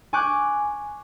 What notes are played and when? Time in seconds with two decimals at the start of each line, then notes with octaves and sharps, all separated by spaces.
0.13 G#5 C#6 D6 F#6 G6